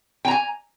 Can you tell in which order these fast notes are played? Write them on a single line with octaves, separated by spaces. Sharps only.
G5 A#5 G#5